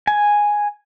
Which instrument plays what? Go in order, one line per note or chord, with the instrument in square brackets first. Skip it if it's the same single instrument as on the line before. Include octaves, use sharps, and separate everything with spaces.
[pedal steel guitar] G#5